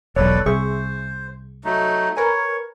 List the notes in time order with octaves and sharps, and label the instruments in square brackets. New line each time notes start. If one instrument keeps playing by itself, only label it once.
[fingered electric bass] E1 B1 [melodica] A4 B4 D5 [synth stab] C#5
[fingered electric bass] C2 [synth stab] G#4 E5 C#6 [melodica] C5
[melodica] F#3 A3 D#4
[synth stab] A#4 B4 G#5 [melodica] C#5